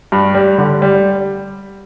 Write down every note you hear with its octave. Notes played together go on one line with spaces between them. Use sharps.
G2
G3
D3
G3